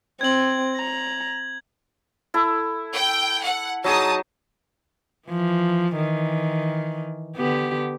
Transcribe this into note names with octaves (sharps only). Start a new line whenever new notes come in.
C4 G#6 F#7
A#5
E4 A4
G5
F#5
F#3 D#4 G#4 A5 D#6
E3 F3
D#3 E3
D3 B3 G4